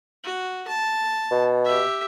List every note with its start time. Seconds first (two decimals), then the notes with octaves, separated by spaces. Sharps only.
0.24 F#4
0.68 A5
1.31 B2
1.65 G4 E5